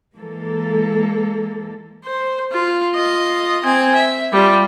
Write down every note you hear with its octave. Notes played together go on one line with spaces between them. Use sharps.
E3 G#3 A#3 A4
C5
F4
F4 D#5
C4 G#5
E5
G3 F4